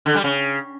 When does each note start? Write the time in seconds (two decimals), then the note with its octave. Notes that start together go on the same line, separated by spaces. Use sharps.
0.06 D3
0.15 G3
0.24 C#3